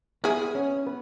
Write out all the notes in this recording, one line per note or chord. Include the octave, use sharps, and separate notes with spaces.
B3 E4 G#4 B4
C#4 C#5
B3 B4